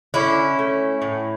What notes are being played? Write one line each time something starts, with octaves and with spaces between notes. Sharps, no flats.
D3 C#4 E4
A3
A2